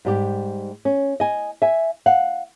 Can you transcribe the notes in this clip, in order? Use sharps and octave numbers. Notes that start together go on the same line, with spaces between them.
G#2 G3 G4
C#4
D#5 G#5
E5 G#5
F5 F#5